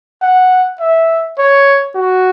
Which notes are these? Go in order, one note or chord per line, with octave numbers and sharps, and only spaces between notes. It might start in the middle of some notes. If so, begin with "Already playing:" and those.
F#5
E5
C#5
F#4